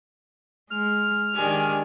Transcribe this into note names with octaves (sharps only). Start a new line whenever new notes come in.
G#3 F6
D#3 G#3 D4 G4 G#5